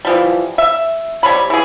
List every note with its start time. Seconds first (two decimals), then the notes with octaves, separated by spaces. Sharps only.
0.05 E3 F3 G3
0.58 E5
1.23 C3 G3 C#5 B5
1.50 E3 G#4